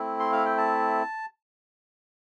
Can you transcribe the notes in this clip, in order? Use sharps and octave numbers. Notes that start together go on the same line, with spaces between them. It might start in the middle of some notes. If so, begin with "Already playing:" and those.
Already playing: A3 C4 E4
C6
F5
G5
A5